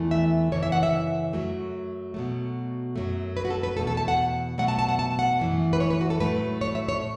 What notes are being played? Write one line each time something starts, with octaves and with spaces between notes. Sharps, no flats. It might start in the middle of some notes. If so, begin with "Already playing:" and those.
Already playing: E2 E3 A3
E5
F#2 C#3 E3 C#5
E5
F#5
E5
F#2 F#3 A3
B2 F#3 A3
F#2 F#3 A3
B4
F#4
A4
B4
E2 B2 A3 A4
A4
A5
F#5
B2 F#3 A3 F#5
A5
A5
F#5
A5
F#5
F#2 E3 A3
B4
C#5
B4
F#4
A4
A2 F#3 A3 B4
C#5
E5
C#5